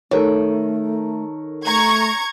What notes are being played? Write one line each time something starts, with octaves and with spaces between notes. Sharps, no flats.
D#3 A3 A4 A#4 C#5
A3 A#5 C#6 G#6